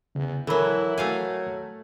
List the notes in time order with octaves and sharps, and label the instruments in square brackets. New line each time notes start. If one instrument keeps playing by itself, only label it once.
[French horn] E2 [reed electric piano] C#3
[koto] E3 F#3 [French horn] E4 [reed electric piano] A4 A#4 B5
[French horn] F#3 [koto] A3 F5 G#5